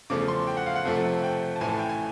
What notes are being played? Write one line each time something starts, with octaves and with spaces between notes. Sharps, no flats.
E2 C#3 F3 A3 D6
C6
G5
F#5
F5
F#5
F2 C3 F3 A3
G5
A5
A1 A2 E3 A3 G#5
A5
G5
G#5